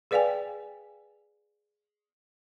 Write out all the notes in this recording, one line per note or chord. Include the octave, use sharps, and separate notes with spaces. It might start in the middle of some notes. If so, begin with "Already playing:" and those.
G#4 B4 D5 F5 G5 G#5